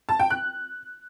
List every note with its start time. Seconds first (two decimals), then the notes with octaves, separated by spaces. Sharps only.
0.09 A5
0.20 G5
0.30 F#6